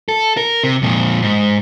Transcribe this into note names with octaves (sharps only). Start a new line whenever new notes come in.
A4
A#4
C3
F2 A#2
G#2